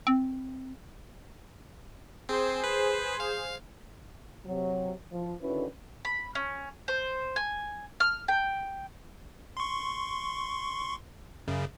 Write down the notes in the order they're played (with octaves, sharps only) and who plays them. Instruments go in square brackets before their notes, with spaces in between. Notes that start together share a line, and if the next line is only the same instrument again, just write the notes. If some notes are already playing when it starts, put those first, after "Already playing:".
[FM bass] C4
[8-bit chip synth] C4 [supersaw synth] G#4 C5
[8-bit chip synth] B4
F5
[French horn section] C3 F#3
F3
D3 D#3 C#4 E4 F#4 B4
[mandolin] B5
C#4
C5
G#5
F6
G5
[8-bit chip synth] C6 C#6
F#2 C#3